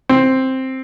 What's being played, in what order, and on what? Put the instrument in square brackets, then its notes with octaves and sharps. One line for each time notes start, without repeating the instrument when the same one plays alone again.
[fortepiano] C4